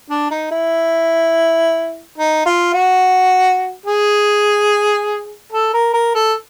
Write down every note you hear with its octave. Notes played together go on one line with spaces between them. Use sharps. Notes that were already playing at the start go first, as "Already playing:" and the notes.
D4
D#4
E4
D#4
F4
F#4
G#4
A4
A#4
A#4
A4